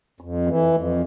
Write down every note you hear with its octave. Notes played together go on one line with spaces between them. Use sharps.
F2
E3
F2